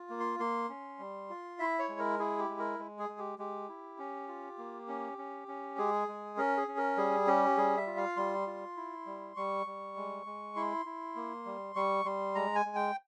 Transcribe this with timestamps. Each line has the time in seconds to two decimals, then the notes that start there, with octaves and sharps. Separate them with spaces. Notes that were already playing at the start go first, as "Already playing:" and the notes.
Already playing: F4
0.10 A#3
0.20 C6
0.39 A#3 C6
0.69 C#4
0.99 G3
1.30 F4
1.59 E4 E5
1.79 C#5
1.89 G#3
1.99 A#4
2.19 E4 G#4
2.39 G4
2.49 G#3
2.59 A#4
2.79 G#3
2.99 G#4
3.09 G#3
3.18 G4
3.38 G#3 G4
3.69 E4
3.98 C#4
4.28 F4
4.58 A#3
4.88 C#4
5.18 C#4
5.48 C#4
5.78 G#3 G#4
6.08 G#3
6.37 C#4 A#4
6.57 G#4
6.68 C#4
6.77 A#4
6.97 G3 G#4
7.27 C#4 G4
7.57 G3 G#4
7.77 E5
7.87 F4
7.97 F5
8.17 G3 C6
8.47 F4
8.77 E4
9.06 G3
9.36 G3 C#6
9.66 G3
9.96 G#3
10.26 G#3
10.56 E4 C6
10.86 E4
11.16 A#3
11.46 G3
11.76 G3 C#6
12.05 G3 C6
12.35 G#3 A#5
12.55 G#5
12.65 G#3
12.75 G5